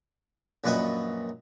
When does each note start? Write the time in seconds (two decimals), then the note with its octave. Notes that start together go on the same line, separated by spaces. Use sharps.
0.64 A#1 F#2 A#2 B4 D#5 E5